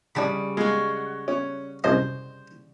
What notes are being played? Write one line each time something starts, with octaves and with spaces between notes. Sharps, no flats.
C#3 G3 D4 A5 B5
G#3 F#4 F5
C#4
C2 F#2 C5 D#5